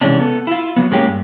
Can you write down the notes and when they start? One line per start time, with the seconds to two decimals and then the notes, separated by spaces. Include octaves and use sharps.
0.01 C3 E3 G#3 C#4 D4
0.19 B3 A4
0.47 E4 F4
0.76 F#3 B3
0.91 A2 G#3 A#3 C#4 G4
1.06 G2